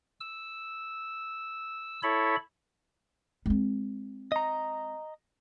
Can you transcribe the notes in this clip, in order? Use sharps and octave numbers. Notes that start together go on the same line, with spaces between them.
E6
E4 A4 C#5 B5
G#3 C4
D#5 A#5